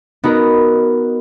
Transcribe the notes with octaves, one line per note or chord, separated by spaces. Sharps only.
B3 D#4 F#4 A#4